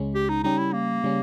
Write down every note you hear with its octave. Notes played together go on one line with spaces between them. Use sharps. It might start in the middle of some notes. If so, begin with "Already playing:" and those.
Already playing: C#2 C#3 G#3 C#4
G4
D#4
C#3 G3 C#4 D#4 G4
E4
A#3
C#3 G3 C#4